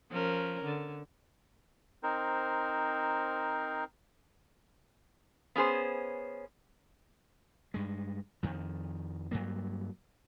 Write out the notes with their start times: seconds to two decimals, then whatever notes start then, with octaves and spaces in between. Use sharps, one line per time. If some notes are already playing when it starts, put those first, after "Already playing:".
0.11 F3 C#4 A#4
0.65 D3
2.03 C4 D#4 A#4 C5
5.56 B3 C#4 G#4 C5
7.74 G2 G#3
8.43 F2 D#3
9.31 G2 F#3 A#3